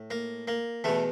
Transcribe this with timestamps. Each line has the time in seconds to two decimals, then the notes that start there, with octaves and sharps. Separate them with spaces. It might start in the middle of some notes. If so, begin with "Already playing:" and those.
Already playing: A2
0.10 A#3
0.48 A#3
0.84 E2 B2 A3